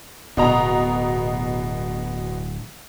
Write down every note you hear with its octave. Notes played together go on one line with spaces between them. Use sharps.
D1 B2 D#5 A#5